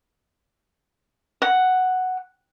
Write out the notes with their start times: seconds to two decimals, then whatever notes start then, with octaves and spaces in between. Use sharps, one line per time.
1.42 F#5